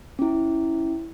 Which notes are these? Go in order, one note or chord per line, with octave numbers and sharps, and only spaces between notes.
C#4 E4